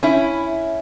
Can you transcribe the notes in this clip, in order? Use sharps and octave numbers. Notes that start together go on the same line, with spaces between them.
C#4 E4